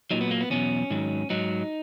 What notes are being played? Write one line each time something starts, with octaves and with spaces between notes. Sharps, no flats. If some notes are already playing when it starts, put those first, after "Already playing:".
A#2 F#3 D#4
B3
A#3
B3
E2 B2 F#3 C#4
G#2 D#3 F#3
G#2 F#3 D#4